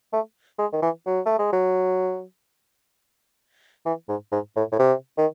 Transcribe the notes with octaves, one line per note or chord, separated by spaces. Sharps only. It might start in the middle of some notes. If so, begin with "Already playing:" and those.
A3
G#3
D#3
E3
F#3
A3
G#3
F#3
E3
G#2
G#2
A2
A2
C3
D#3